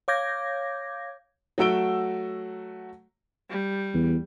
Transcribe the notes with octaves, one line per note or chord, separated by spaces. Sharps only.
C#5 F5 D6 G6 G#6 A#6
F#3 A3 F#4 E6 D7 G7
G3
E2